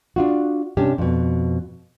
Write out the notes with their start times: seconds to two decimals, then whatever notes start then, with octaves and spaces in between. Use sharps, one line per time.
0.16 D4 F4 F#4
0.77 C3 C#4 D4 G4
0.98 F2 B2